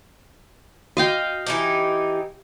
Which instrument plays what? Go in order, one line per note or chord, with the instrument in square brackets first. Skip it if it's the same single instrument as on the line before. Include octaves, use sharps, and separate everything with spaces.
[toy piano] F#4 [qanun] D#5 F5 G5
[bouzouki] E3 D#4 G4